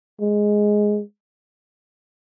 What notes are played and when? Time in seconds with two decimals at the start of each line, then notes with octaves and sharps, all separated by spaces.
0.20 G#3